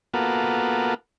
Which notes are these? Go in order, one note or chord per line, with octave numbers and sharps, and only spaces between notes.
A#3 B3 F4 F#4 A4